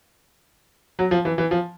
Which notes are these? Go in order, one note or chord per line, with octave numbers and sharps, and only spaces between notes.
F#3
F3
E3
E3
F3